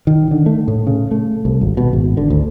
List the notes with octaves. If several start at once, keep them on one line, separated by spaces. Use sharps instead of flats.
D#3
D3
A3
A2
C#3
A3
C2
G#1
B2
G#1
D3
D2